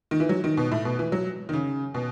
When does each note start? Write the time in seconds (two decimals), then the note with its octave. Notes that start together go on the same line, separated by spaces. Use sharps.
0.11 D#3
0.20 E3
0.29 F#3
0.44 D#3
0.57 B2
0.72 A2
0.85 B2
0.99 E3
1.12 F#3
1.49 D#3
1.53 C#3
1.94 B2